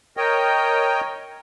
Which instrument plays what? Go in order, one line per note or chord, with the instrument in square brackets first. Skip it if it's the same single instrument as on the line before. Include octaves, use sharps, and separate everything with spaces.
[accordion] A#4 C#5 D#5 G5